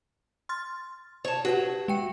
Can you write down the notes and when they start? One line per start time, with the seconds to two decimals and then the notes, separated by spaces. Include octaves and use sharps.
0.49 C6 F6 A6
1.25 C#5 A5
1.45 F#4 G4 B4 F#5
1.88 G#3 G5 C#7